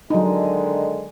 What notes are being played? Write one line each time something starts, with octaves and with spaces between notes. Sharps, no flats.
D3 D#3 F#3 G#3 D#4